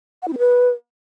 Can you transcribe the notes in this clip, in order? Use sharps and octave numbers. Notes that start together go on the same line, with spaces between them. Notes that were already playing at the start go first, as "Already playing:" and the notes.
F#5
E4
C4
B4